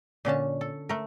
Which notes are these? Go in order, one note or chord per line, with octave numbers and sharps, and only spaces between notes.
A#2 D3 C#4 A5
A4
A3 A#4